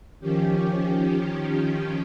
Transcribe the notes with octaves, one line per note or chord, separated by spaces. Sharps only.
D#3 F3 C#4 G4